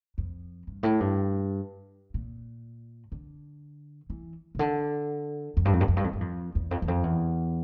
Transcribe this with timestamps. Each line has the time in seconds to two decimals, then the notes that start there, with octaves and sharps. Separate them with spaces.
0.18 F2
0.67 G2
0.83 A2
1.00 G2
2.14 A#2
3.12 D3
4.10 E3
4.55 C3
4.59 D3
5.57 F2
5.65 G2
5.73 F2
5.81 G2
5.88 F2
5.97 G2
6.04 F2
6.13 G2
6.21 F2
6.55 E2
6.71 F2
6.82 E2
6.88 F2
7.04 E2